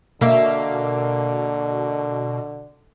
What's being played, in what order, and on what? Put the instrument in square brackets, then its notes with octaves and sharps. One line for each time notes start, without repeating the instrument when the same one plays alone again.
[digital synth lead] B2 [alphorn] D3 [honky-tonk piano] A#3 F5 [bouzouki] E5